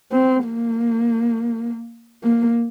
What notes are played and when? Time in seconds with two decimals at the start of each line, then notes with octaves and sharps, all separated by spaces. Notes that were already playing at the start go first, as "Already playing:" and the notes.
0.12 C4
0.46 A#3
2.23 A#3